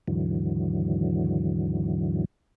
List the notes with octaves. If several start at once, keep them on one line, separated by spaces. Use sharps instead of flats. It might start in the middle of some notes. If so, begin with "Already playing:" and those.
D#2 G#2 D3 E3 F#3